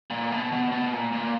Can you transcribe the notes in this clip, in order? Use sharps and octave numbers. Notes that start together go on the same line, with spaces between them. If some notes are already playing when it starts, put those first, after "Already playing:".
A#2
B2
B2
B2
A#2
A#2